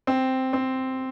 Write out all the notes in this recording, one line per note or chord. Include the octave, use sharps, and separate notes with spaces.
C4
C4